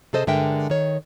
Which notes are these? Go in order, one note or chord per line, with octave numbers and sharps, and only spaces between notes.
C3 G#4 A4 C5 D#5
G2 D3 G#3 A#4 E5 G5
D#3 C#5